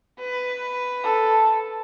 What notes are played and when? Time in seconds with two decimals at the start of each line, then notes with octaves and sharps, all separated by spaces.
0.19 B4
1.03 A4